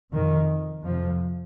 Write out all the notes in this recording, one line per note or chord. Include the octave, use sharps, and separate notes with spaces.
F2 C3 D#3
F2 C3 F3